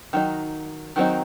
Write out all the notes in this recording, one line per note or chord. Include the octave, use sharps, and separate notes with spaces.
D#3 F#3 D#4
D#3 F#3 C4 D#4